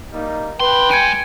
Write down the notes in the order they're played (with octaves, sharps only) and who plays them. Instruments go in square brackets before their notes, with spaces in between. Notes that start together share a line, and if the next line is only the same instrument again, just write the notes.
[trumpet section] G3 A#3 D#4
[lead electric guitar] D4 C6 [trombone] B4 [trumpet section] G5
[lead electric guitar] G#3 G#5 [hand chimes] G#6 C#7 D7